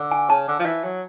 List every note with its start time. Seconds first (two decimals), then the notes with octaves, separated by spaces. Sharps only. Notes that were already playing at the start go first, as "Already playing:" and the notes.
Already playing: D3
0.11 G#5
0.29 C#3 A5
0.48 D3
0.59 F3
0.65 E3
0.84 F#3